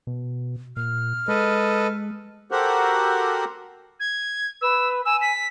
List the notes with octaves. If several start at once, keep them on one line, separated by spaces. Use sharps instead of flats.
B2
A#2 F6
G#3 A4 B4 D#5
F#4 G4 A4 A#4 C5 F#5
G#6
B4 E6
G#5 E6
B6